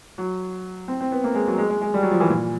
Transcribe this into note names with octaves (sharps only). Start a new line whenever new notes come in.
F#3
C4
C4
B3
A#3
G#3
F#3
G#3
G#3
G#3
G3
F#3
F3
E3
A#2